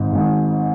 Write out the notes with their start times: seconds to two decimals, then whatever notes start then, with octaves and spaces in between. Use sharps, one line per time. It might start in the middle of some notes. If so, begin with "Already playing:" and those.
Already playing: G#1 G#2 D#3
0.12 G#1 G#2 D#3